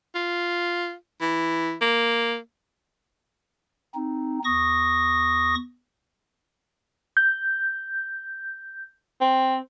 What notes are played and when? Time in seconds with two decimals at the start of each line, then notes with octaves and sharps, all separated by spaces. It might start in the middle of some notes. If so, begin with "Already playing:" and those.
0.15 F4
1.21 E3
1.81 A#3
3.94 C4 D#4
4.45 E2 C#6 D#6 A#6
7.17 G6
9.21 C4